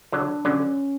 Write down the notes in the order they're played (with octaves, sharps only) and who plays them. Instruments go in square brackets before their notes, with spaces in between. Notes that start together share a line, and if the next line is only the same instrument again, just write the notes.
[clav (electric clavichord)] D3 F#3 [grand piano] D4
[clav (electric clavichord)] D3 F#3 [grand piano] C#4